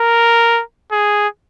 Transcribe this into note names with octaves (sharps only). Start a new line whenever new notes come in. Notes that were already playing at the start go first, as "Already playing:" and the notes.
Already playing: A#4
G#4